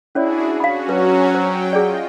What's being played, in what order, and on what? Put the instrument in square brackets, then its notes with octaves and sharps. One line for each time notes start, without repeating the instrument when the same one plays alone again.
[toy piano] C#4 C#5 D5 [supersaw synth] D4 F#4 G#4 [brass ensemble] E4
[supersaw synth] C#4 F#4 [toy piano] F5 B5
[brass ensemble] F#3 [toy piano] B4
[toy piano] C5 [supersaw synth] G5
[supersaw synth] F4 D#5 [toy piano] G#4 D5